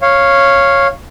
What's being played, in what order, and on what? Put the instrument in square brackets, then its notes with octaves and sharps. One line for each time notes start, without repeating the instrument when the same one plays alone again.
[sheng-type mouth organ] C#5 F5